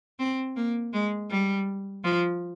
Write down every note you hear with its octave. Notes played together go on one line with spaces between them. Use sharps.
C4
A#3
G#3
G3
F3